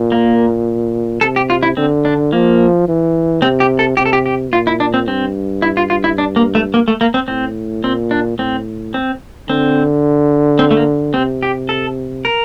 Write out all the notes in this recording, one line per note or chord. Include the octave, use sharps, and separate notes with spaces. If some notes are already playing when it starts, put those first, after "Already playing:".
Already playing: A#2
A#3
C3 A4
G4
F4
E4
D3 C4
D4
F3 A#3
E3
C3 C4
G4
A4
C3 G4
A4
G4
G4
A#2 F4
E4
D4
C4
G2 C4
E4
F4
F4
E4
D4
A#3
A3
A#3
A3
A#3
C4
A2 C4
A#2 C4
D4
A2 C4
C4
D3 C4
C4
A3
A#3
C3 C4
G4
A4
A#4